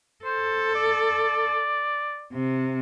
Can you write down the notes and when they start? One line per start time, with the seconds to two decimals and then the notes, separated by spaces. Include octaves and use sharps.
0.25 A4 C5
0.75 D5
2.33 C3